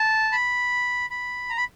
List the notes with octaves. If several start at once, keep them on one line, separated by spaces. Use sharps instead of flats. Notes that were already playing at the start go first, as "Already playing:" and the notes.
Already playing: A5
B5
B5
A#5
B5